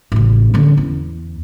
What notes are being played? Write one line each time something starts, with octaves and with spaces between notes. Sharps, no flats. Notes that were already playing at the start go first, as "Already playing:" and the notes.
A1 C#3
D3 C#4
E2